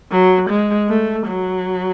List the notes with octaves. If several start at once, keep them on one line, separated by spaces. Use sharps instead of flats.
F#3
G#3
A3
F#3